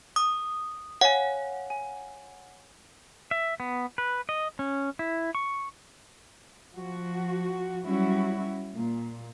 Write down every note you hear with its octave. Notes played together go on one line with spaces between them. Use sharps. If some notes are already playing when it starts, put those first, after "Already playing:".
D#6
C#5 F5 F#5 G#5
G#5
E5
B3
B4
D#5
C#4
E4
C#6
F3 F#4
F#3 G3 C#4 E4 F#4
A#2